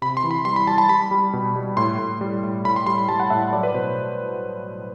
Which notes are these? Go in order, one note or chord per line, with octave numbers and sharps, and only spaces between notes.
C3 B5
C6
E3
B5
G3 C6
B5
G3 A5
A5
G3 B5
G3
B2
G3
A2 C6
A2
G3
A2
A2 B5
C6
G3 C6
B5
G3 A5
F#5
A2 E5
F#3 D5
B4
B2 C5